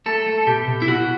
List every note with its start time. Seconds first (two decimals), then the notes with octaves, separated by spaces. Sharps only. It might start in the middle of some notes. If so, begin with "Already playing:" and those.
0.06 A3 A4
0.26 A3
0.47 B2 G4
0.68 B2
0.82 E4
0.87 B2 F#4